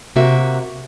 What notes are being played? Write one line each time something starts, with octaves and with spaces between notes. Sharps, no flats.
C3 A#3 F#4 E5